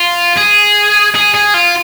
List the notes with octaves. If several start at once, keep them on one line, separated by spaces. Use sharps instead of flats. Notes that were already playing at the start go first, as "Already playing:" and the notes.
Already playing: F4
G#4
G#4
G#4
F4